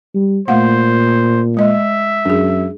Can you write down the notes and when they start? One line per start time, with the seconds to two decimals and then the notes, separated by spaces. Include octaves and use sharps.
0.14 G3
0.48 A#2 A3 C5 F5 F#5
1.57 G#3 D#5 E5
2.25 F#2 D4 G#4